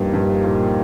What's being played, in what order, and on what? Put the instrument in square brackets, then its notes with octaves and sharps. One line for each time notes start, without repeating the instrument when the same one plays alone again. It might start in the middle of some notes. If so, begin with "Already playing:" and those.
Already playing: [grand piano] G2 [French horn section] F3 A#3 D#4 G4
[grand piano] G2
A#2